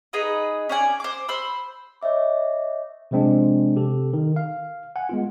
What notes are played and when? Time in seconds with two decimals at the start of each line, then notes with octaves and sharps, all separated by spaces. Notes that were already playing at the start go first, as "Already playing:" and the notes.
0.13 D#4 G#4 B4 D#5
0.69 C#4 D5 G#5
1.00 C5 D6
1.28 C5 B5 E6
2.01 C#5 D#5 E5 D6
3.11 C3 F3 G#3 C4 D4
3.76 C3 G4 A4
4.13 D#3
4.36 F5
4.96 F#5 G#5
5.09 G#3 B3 F4